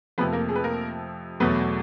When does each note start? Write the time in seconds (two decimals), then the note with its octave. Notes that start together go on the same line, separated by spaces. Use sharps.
0.18 F2 C3 F3 A3 B3 B4
0.32 A#3 A#4
0.48 G#3 G#4
0.56 B4
0.64 A#3 A#4
1.40 E2 B2 F#3 A3 B3 B4